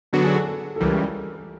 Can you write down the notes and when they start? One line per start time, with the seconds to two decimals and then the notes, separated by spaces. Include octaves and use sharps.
0.13 D3 F#3 B3 D4 F#4 A4
0.24 G#4
0.35 A4
0.46 A4
0.76 A4
0.80 C#2 C#3 E3 G3 A#4